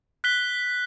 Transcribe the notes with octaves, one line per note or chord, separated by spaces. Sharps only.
F#6 B6 G7